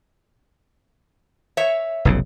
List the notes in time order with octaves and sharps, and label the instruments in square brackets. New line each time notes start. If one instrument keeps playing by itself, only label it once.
[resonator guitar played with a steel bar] C#5 E5
[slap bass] F1 B1 C#3